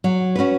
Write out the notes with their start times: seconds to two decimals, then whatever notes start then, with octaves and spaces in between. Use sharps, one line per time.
0.04 F#3
0.35 C#4 F#4 B4